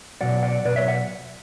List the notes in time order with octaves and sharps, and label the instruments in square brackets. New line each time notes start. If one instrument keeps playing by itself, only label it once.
[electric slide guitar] B2 F#3 D5 F#5
D5 F#5
B2 F#3 B4 D5
C#5 E5
D5 F#5